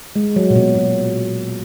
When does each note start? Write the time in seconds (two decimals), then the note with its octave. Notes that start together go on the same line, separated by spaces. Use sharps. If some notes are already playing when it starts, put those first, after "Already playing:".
0.16 G#3
0.36 F#3
0.50 A#2
0.56 B2
0.75 A#2